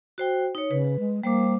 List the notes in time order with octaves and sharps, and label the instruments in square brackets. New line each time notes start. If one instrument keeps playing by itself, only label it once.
[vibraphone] F#4 C5 G5
D#4 C#5
[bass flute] C#3 [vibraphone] B4
[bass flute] G#3
[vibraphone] G3 C5 D6 [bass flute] A#3